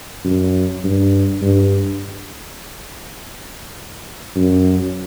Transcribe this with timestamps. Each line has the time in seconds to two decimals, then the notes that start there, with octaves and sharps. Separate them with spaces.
0.25 F#2
0.84 G2
1.42 G2
4.36 F#2